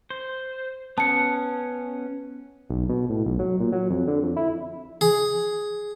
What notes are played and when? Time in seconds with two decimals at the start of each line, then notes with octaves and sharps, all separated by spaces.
0.10 C5
0.98 B3 C#4 A5 C#7
2.70 B1
2.89 B2
3.10 A2
3.26 B1
3.39 F#3
3.60 A#2
3.73 F#3
3.90 F2
4.08 D3
4.23 F2
4.36 E4
5.01 G#4